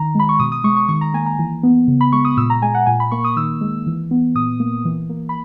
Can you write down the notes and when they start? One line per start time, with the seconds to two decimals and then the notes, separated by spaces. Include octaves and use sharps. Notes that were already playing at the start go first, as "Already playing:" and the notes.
Already playing: D#3 A#5
0.15 G#3 B5
0.29 C#6
0.39 B2 D#6
0.52 D#6
0.64 G#3 C#6
0.76 C#6
0.89 D#3 C#6
1.01 A#5
1.14 A#3 G#5
1.26 A#5
1.39 E3
1.63 B3
1.88 C#3
2.01 B5
2.12 G#3 C#6
2.25 D#6
2.37 A#2 E6
2.50 A#5
2.62 G#3 G#5
2.74 F#5
2.86 A#2 G#5
3.00 B5
3.12 A#3 C#6
3.24 D#6
3.36 D#3 E6
3.61 G#3
3.87 E3
4.11 B3
4.35 A#2 D#6
4.60 A#3
4.85 E3
5.10 A#3
5.29 B5